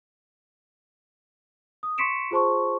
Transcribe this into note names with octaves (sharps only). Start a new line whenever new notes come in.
D#6
C6 C#6 B6 C#7 D7 E7
F4 G#4 C5 A5 C6 C#6